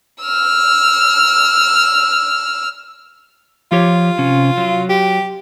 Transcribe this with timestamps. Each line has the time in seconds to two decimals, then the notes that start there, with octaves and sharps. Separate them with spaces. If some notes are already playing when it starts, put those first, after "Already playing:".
0.23 E6 F6
3.72 F3 F4 G4 C#5
4.18 C3 C#4
4.57 F#3
4.89 G4